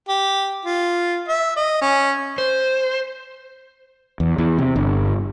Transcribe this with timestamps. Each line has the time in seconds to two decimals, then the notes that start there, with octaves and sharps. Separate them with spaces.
0.09 G4
0.65 F4
1.28 E5
1.56 D#5
1.81 C#4
2.38 C5
4.20 E2
4.38 E2
4.59 C3
4.76 G1